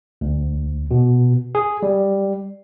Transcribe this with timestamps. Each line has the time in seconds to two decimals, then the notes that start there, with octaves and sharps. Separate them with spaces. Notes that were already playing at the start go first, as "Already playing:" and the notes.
0.21 D2
0.91 B2
1.55 G#4
1.83 G3